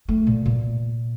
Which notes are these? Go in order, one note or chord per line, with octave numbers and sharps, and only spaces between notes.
A3
A#2
A#2